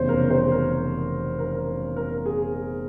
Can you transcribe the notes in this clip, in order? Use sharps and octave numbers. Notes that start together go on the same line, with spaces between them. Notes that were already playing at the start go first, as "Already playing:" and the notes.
Already playing: F1 E2 C#3 C5 C#5
A#4
C5
A#4
A#4
A#4
G#4